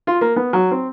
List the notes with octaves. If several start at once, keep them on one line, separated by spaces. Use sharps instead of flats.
F4
A#3
B3
F#3
C4